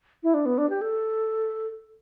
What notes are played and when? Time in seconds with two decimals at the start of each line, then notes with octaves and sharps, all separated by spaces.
0.23 E4
0.34 D4
0.46 B3
0.58 D4
0.70 G4
0.81 A4